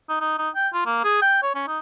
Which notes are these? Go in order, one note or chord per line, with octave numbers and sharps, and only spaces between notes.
D#4
D#4
D#4
G5
F4
A#3
G#4
G5
C#5
C#4
D#4